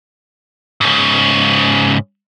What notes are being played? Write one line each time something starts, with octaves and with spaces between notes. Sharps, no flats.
G#2 C#3